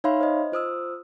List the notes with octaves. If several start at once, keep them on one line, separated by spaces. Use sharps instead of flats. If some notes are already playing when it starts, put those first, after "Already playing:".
D#4 C#5 E5 F5 B5 C6
C5 D#5
F4 C5 D#6 E6